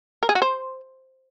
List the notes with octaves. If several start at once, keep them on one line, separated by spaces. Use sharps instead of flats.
A#4
G#4
F#4
C5